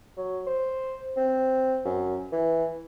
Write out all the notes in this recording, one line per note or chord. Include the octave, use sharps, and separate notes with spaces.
F#3
C5
C4
F#2
E3